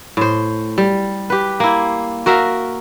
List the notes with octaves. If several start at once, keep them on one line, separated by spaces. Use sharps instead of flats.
A2 C5
G3
G4 B4
A#3 E4
F#4 A#4 E5 F5